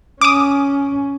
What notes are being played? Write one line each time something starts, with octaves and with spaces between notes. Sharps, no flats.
C#4 D6 D#6